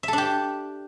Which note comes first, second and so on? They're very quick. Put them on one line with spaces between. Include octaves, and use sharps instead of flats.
E5 A4 D4 G4